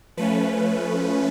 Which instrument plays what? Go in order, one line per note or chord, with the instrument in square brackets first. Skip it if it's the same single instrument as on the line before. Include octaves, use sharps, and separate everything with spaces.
[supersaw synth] F3 A3 C#4 B4